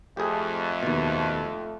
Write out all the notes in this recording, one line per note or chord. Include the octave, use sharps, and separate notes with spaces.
F2 A3 G4 G#4
D#2 B2